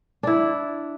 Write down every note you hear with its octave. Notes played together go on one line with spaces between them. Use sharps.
D4 E4